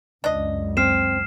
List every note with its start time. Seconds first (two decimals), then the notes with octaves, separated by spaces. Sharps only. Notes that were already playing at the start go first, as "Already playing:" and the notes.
0.24 C#2 F#2 D4 D#5
0.77 C4 F6 C7 E7